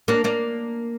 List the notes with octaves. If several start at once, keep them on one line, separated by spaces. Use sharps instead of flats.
A#3 D4
A#3 D4